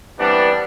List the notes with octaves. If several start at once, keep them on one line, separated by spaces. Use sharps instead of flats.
C3 E3 G3 B3 D4